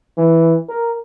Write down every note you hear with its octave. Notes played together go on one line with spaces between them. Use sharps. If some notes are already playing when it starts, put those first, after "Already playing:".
E3
A#4